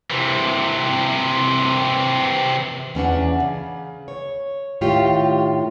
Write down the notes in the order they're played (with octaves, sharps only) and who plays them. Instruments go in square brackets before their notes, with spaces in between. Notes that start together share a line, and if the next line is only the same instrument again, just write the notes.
[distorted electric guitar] C3 E3
[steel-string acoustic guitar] E2 C#4 D4 F#5
C#3
C#5
A2 D#3 F4 G4 C#5